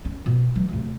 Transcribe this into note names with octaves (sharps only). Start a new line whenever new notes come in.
C#4
B2
E3 F#3
D2 C3